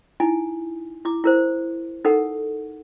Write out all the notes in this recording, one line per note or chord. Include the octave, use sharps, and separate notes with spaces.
D#4 E4 G#5
E4 D6
E4 A#4 C5
D#4 A4 A#4 F#5